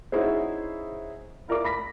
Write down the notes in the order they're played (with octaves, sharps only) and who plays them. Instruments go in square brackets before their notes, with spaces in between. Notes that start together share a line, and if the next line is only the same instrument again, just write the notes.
[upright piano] C#4 D#4 E4 F#4 G#4 C5
E4 F4 A#4 D5 F5 D6
B5 A#6 B6